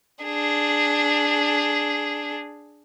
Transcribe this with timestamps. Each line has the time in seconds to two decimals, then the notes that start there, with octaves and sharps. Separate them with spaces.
0.25 D4 G#4